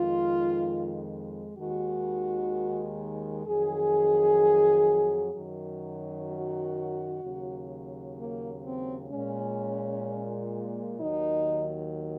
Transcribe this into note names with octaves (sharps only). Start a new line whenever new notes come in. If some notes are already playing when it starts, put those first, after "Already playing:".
Already playing: F2 D#3 G#3 F4
D#2 D#3 G#3 F#4
F2 D#3 F#3 G#4
F#2 D#3 F#3
F#4
D#2 C#3 F#3
A#3
C4
A#2 G#3 C#4
D#2 D#3 F#3 D#4